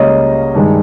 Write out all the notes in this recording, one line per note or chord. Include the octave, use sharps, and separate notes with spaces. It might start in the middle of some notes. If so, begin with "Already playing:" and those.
Already playing: C#2 C#3 G3 A#3 C#4 C#5 D#5
G2 D#3 G#3